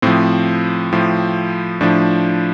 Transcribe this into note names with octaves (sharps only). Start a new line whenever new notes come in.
A2 F3 C4
A2 F3
A2 F3 D4